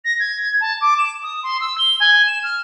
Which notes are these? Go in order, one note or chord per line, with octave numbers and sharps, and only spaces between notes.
A#6
G#6
A5
D6
E7
D#6
C6
E6
G7
G#5
E7
F6